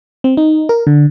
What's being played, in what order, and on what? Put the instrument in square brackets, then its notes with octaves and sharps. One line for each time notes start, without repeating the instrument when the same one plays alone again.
[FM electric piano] C4
D#4
A#4
D3